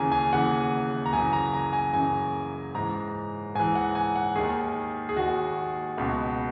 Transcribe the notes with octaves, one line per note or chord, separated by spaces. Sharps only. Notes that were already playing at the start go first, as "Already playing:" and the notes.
Already playing: D#2 C#3 E3 G#5 A#5
G#5
D#2 C#3 E3 F#5
A#5
F#2 C#3 E3 G#5
A#5
A#5
G#5
F#2 C#3 E3 G#5
G#2 E3 A#5
G#2 E3 G#5
F#5
G#5
F#5
D#2 D#3 G#4
G#4
D#2 D#3 F#4
C#2 B2